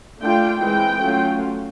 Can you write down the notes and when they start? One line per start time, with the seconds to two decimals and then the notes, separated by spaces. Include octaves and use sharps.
0.22 A3 D4 F4 G5
0.62 E3 G#3 C4 G5
1.01 F#3 A3 C#4 F4